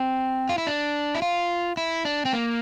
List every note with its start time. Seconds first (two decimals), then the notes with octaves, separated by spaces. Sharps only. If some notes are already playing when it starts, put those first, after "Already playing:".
Already playing: C4
0.49 F4
0.58 E4
0.67 D4
1.15 E4
1.22 F4
1.77 E4
2.05 D4
2.25 C4
2.33 A#3